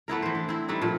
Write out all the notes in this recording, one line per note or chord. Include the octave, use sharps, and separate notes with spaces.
A3 B3 E4 A#4
E3 C5
D4
C4 E4
G3 A3 D4 D#4
A#2 F3 A3